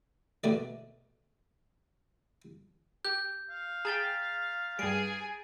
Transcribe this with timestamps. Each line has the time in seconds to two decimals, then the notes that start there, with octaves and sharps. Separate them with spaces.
0.44 B2 A3 D5
3.05 G4 G6
3.51 F5
3.85 G#4 G5 A#5 A6 B6
4.79 G2 G3 G#4 G#5 D7